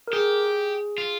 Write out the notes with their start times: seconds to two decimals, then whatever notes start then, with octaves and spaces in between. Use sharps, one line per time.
0.08 A#4
0.13 G4 G#4
0.98 F4